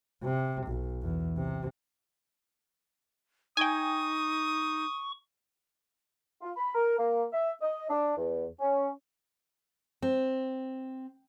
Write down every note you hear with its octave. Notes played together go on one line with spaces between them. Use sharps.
C3
B1
E2
C3
D#4 G5 G#5 C#6 D#6
F4
B5
A#4
A#3
E5
D#5
D4
E2
C#4
C4